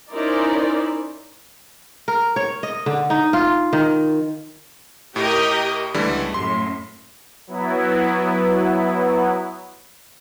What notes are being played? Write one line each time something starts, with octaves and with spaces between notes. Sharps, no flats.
C#4 D#4 E4 A#4 C5 D5
A#4
C#5
D#5
D3
D#4
F4
D#3
A2 G4 A#4 D#5
C#2 D3 E3 G3 A3
F#2 A2 C6
F#3 B3 E4